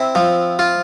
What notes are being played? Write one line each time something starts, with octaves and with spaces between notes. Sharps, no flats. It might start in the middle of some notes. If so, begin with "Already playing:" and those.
Already playing: C4 E4 E5
F3
F4